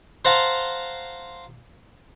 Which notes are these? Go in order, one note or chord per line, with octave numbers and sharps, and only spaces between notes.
C5 F5 F#5 A5 A#5 C6